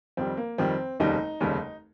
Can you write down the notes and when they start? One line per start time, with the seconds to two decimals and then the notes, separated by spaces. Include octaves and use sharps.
0.17 F2 D#3 G3 C4
0.37 A#3
0.58 F2 D#3 G3 C4
1.00 F1 D#2 C#3 G3 D#4
1.41 F1 D#2 C#3 G3